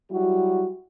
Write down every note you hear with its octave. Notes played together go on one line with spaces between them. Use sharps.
F#3 G3 E4 F#4